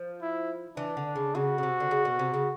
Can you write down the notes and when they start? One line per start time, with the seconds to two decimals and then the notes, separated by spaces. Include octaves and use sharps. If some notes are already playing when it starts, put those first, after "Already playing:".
Already playing: F3
0.22 E4
0.77 E3 D4
0.97 D3
1.15 C#3
1.35 C#3 F#4
1.58 C#3
1.63 C3
1.80 D3
1.91 C#3
2.05 B2
2.19 C3
2.34 C#3